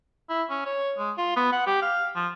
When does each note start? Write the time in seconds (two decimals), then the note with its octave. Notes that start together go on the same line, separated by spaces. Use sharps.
0.30 E4
0.50 C#4
0.66 C#5
0.99 G#3
1.17 F4
1.36 B3
1.53 F#5
1.67 G4
1.82 F5
2.16 F3